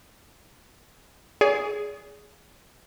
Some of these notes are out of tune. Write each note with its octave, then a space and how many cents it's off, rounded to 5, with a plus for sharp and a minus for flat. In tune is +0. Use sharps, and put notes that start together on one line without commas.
G#4 +0 D5 -45